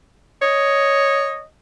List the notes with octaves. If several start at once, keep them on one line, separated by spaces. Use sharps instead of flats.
C#5 D#5